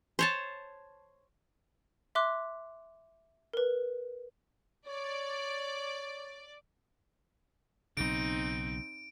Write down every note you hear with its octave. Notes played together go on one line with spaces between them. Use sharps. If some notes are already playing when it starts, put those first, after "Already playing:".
C5 C#5 A5
E5 C6 D6 F#6
A#4 B4
C#5 D5
B1 C#3 C4 D#4 D7